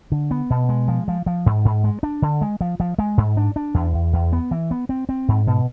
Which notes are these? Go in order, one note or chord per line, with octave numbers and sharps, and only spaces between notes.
D3
B3
B2
G#3
F3
F3
F3
G#2
G#2
G#3
D4
D3
G#3
F3
F3
G#3
G#2
D4
D4
E2
E2
E2
B3
E3
B3
C4
C4
G#2
B2